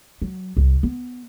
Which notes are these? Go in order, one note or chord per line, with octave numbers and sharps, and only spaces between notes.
F#3
C2
B3